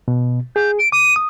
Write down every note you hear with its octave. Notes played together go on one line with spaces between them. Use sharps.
B2
G#4 G6
D7
D6 D#7
D#6